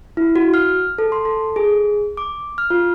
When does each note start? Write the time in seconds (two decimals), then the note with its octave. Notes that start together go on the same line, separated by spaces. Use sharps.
0.17 E4
0.36 F#4
0.54 F6
0.98 A4
1.12 C6
1.25 A4
1.56 G#4
2.17 D6
2.58 F6
2.70 F4